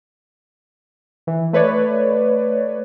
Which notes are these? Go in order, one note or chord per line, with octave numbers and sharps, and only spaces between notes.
E3
A3 B4 C#5 D5